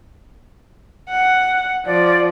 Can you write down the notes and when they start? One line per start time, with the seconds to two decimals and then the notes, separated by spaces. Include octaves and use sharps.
1.10 F#5
1.86 F3 D5